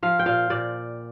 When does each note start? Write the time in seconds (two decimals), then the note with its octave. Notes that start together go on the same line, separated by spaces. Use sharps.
0.03 F3 F5
0.19 G5
0.26 A#2 F5
0.50 A#2 D5